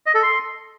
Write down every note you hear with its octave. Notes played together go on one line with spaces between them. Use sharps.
D#5
A4
C6